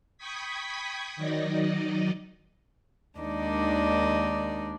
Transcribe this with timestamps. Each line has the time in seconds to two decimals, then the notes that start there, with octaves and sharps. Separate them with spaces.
0.18 G5 B5 C#6 D#6 G#6 B6
1.16 D#3 F#3 D#4 D5 D#5
3.18 D#2 D#3 G#3 D4 D#4 D5